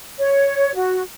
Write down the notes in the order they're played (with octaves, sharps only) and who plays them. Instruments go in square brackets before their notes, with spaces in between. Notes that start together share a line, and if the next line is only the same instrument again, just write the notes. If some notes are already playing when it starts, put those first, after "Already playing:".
[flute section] C#5
F#4